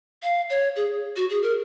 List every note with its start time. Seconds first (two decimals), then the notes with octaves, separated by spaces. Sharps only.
0.23 F5
0.50 C#5
0.76 G#4
1.16 F#4
1.30 G#4
1.43 A#4